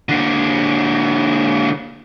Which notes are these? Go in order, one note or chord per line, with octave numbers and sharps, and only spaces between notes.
D3 A#3